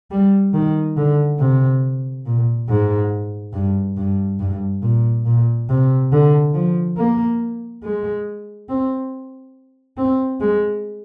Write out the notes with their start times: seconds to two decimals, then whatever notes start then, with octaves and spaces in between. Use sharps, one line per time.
0.11 G3
0.54 D#3
0.97 D3
1.40 C3
2.26 A#2
2.69 G#2
3.53 G2
3.97 G2
4.40 G2
4.82 A#2
5.26 A#2
5.69 C3
6.12 D3
6.54 F3
6.97 A#3
7.83 G#3
8.69 C4
9.97 C4
10.40 G#3